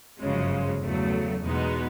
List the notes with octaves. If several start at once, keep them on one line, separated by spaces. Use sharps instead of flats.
G1 F#2 C#3 F3 G#3
E2 C#3 F#3 A3
E2 B2 G#3 B3 D#4